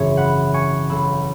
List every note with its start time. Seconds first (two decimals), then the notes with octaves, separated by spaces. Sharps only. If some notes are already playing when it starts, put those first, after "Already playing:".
Already playing: G#1 F#2 C#3 E3 C#5 E5
0.17 F#5 B5
0.54 G#5 C#6
0.89 B1 B2 B5 E6